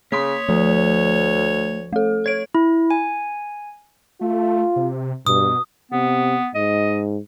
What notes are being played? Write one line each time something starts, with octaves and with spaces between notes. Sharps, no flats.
C#3 A#3 C#5 C6 D#6 B6
D2 F3 A3
A3 A4
C#5 G#6 D7
E4
G#5
A3 F4
C3
G2 B2 D#6
C3 B3
G#2 D#5